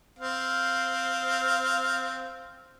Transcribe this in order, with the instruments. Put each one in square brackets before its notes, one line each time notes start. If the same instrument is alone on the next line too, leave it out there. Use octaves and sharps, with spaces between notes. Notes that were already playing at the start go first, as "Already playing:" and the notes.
[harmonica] C4 F5